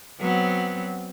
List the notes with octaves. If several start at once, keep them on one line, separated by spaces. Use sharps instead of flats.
F#3 B3 C4